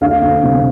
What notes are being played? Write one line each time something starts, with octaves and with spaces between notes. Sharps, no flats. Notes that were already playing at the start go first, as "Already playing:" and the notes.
D2 F5
D2
C3